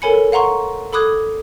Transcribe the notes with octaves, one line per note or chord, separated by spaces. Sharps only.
A4 A#4 C#5 G#5 B5 C#7
F5 F#5 A#5 C6 C#6
A4 B5 D6 D#6 F#6 G#6